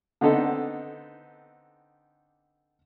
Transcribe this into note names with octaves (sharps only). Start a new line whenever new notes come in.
D3 B3 C4 D#4 A4